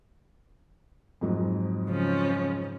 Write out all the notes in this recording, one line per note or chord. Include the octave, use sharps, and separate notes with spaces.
F2 G#2 F#3
C#3 F3 C#4